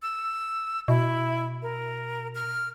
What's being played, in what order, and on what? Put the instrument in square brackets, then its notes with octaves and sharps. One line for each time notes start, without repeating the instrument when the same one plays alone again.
[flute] E6
[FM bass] B2 [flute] E4
[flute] A#4
F6